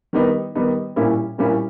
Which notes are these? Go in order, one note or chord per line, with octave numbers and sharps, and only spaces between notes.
D#3 G3 B3 D#4
D#3 G3 B3 D#4
A#2 G3 A#3 C#4 E4
A#2 G3 A#3 C#4 E4